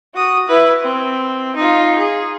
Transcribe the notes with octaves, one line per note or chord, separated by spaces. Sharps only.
F#4 D#6
E4 B4
C4
D#4 F4
G#4